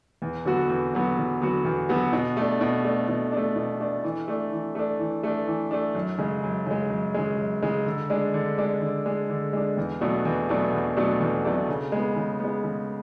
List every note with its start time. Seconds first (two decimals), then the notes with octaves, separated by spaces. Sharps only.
0.22 E2
0.45 D3 F#3 B3 F#4
0.69 E2
0.93 D3 F#3 B3 F#4
1.17 E2
1.41 D3 F#3 B3 F#4
1.65 E2
1.89 D3 F#3 B3 F#4
2.13 B2
2.37 A3 D4
2.61 B2
2.84 A3 D4
3.08 B2
3.32 A3 D4
3.56 B2
3.80 A3 D4
4.04 E3
4.28 A3 D4
4.52 E3
4.75 A3 D4
4.99 E3
5.23 A3 D4
5.47 E3
5.71 A3 D4
5.95 F#2
6.18 C#3 G#3
6.43 F#2
6.66 C#3 G#3
6.90 F#2
7.14 C#3 G#3
7.38 F#2
7.62 C#3 G#3
7.86 D3
8.10 G#3 D4
8.34 D3
8.58 G#3 D4
8.82 D3
9.06 G#3 D4
9.30 D3
9.53 G#3 D4
9.77 E2
10.01 B2 F#3 A3 D4
10.25 E2
10.49 B2 F#3 A3 D4
10.73 E2
10.97 B2 F#3 A3 D4
11.20 E2
11.44 B2 F#3 A3 D4
11.69 C#3
11.92 G#3 B3
12.16 C#3
12.40 G#3 B3
12.64 C#3